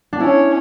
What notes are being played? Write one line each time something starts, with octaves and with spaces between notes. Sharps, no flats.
D4
C#4 E4